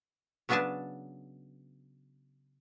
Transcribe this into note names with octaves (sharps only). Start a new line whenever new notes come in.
C#3 F#3 B3 D4 G#5 A5